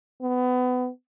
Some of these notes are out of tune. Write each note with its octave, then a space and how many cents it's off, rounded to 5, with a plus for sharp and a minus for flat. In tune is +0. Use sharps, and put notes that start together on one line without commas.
B3 +25